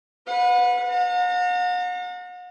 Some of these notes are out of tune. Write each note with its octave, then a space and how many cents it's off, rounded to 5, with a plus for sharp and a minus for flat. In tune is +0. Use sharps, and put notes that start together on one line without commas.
B4 +0 F#5 -35
F#5 -45 A#5 -35